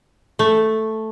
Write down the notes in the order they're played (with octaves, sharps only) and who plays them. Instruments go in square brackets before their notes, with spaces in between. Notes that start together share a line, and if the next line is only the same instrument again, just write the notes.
[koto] A3